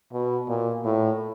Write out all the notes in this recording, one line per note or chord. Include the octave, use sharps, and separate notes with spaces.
B2
A#2
A2